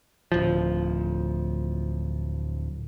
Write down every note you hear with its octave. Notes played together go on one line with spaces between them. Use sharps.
D1 F3